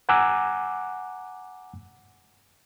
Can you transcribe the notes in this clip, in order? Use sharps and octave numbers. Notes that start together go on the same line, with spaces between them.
F#5 G#5 A#5 D6 E6 F#6